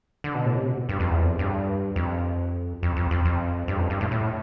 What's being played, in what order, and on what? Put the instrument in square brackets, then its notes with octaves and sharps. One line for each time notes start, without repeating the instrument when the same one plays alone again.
[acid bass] D3
B2
A2
C3
B2
G2
F2
E2
F2
G2
F2
F2
F2
F2
F2
G2
F2
G2
A2
A2